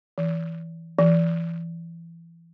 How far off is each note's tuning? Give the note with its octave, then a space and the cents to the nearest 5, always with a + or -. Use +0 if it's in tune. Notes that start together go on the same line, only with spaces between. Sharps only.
E3 +0
E3 +25